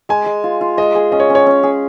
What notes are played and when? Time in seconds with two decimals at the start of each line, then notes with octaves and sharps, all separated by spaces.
0.09 G#3 G#5
0.26 G#3
0.44 F4
0.61 F4
0.77 G#3 D#5
0.95 G#4
1.12 C#4 D#5
1.20 C#5
1.30 C#4
1.35 C#5
1.46 C#4
1.63 G#4